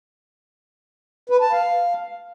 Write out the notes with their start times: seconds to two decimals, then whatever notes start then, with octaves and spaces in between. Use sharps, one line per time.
1.30 B4
1.41 A5
1.52 F5